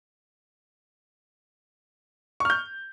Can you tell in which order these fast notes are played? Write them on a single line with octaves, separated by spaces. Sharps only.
C#6 F6 G6